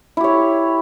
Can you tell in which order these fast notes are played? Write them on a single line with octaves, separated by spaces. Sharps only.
E4 G4 C#5